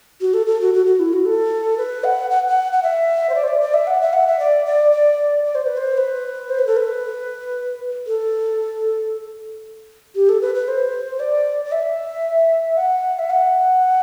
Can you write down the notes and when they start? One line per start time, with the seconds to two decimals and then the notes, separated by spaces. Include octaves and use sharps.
0.21 F#4
0.34 A4
0.47 A4
0.61 F#4
0.74 F#4
0.86 F#4
1.00 E4
1.13 F#4
1.26 A4
1.78 B4
2.04 F#5
2.31 F#5
2.48 F#5
2.73 F#5
2.83 E5
3.29 C5
3.35 D5
3.44 C5
3.48 D5
3.62 D5
3.74 E5
3.87 F#5
4.01 E5
4.13 F#5
4.27 E5
4.39 D5
4.66 D5
4.92 D5
5.44 D5
5.55 C5
5.66 B4
5.77 C5
5.97 B4
6.50 C5
6.59 B4
6.67 A4
6.77 B4
8.07 A4
10.15 G4
10.29 A4
10.42 B4
10.55 B4
10.68 C5
11.20 D5
11.65 D5
11.72 E5
12.77 F#5
13.19 E5
13.30 F#5